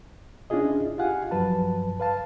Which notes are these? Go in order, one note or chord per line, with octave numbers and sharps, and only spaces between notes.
C#4 D4 E4 F4 G#4 D#5
F4 G4 F5 F#5 G#5
G2 F3 F#3 B4 A5
B4 F5 A5